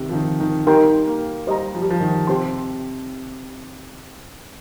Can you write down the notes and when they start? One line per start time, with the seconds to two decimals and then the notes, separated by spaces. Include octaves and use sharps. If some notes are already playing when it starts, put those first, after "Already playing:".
Already playing: C3 D#3
0.09 F3
0.13 D#3
0.40 D#3
0.67 G3 D#4 A#4 G5 C6
1.07 A#3
1.47 G3 C5 D#5 A#5
1.74 F3
1.82 G3
1.90 F3
2.01 D#3
2.27 C3 G4 C5 G5 C6